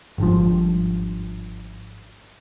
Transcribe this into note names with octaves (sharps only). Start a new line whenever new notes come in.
G#1 G2 F3